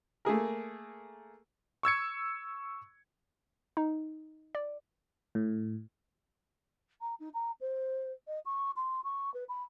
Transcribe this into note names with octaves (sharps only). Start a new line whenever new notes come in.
A3 A#3 G#4 A#4
C#6 E6 G#6 C#7
D#4
D5
A2
A#5
D#4
A#5
C5
D#5
C#6
C6
C#6
B4
B5